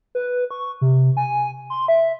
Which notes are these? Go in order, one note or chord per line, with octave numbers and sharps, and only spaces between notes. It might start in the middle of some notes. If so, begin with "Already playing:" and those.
B4
C#6
C3
G#5
C6
E5